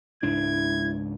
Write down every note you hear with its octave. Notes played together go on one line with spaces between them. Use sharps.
C#2 G#2 D4 E4 G#6